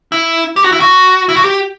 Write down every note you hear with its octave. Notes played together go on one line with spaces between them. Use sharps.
E4
G4
F#4
E4
F#4
E4
F#4
G4